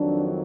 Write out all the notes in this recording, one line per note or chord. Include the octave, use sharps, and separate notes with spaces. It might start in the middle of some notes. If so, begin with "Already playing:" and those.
Already playing: F2 D#3 F#3 D4